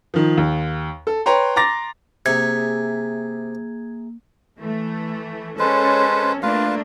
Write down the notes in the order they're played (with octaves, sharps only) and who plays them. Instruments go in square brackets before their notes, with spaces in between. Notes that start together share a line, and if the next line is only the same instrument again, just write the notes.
[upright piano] D#3 F3
D#2
A4
B4 C#5 G5 A#5 C6
A#5 C6 D6 A6 A#6
[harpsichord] C3 [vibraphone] A#3 [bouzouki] G#4 E5 [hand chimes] G#6
[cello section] E3 A3
[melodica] G#3 B4 C5 [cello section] C#4 A4
[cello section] A3 A#3 D4 [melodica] F4 B4 F5